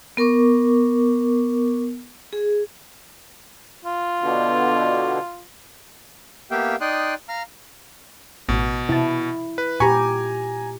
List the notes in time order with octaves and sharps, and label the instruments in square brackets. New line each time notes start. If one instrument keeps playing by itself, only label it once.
[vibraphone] B3 A#4 C#6 D6
G#4
[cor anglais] F4
[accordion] B2 D3
[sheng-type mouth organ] A#3 B3 G4 E5 F5 G5
D#4 D5 G5 C6 D#6 F#6
F5 A#5 F6
[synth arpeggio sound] A1 [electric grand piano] B2
[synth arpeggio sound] C3 A5 [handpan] E4
[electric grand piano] B4
[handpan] A#2 G4 [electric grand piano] G#5 A#5 [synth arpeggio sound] B5 C#6